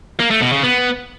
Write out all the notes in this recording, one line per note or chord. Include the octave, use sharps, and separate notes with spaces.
A#3
A3
B2
C#3
B3